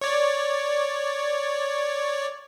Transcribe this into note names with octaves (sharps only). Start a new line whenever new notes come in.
C#5 D5